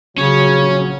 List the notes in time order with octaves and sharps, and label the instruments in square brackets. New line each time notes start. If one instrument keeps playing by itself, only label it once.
[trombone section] A#1 F#3 [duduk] C#3 [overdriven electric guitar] C#4 [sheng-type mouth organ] C#5